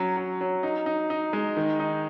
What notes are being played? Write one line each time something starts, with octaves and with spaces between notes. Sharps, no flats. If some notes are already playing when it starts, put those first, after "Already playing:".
Already playing: F#3 C#4
F#3
F#3
D#4
D#4
D#4
G#3
D#3
D#4